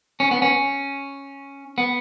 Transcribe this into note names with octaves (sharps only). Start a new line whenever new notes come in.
C#4
B3
C#4
B3